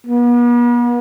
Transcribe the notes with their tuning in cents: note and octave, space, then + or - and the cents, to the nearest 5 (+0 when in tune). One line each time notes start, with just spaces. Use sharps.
B3 -45